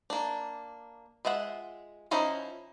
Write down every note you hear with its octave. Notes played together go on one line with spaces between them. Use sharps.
A#3 D4
G#3 F4 E5 F#5
F3 C#4 D#4 E4